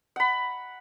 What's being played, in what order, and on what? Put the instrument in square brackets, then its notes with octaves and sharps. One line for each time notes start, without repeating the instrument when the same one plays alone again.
[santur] F#5 B5